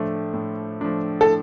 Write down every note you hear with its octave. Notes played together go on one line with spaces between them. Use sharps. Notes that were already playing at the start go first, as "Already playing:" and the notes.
Already playing: A2 F3 A3 D4
A2
F3 A3 D4
A4